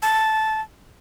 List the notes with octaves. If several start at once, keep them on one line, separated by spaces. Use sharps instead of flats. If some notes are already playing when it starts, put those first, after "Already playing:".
A5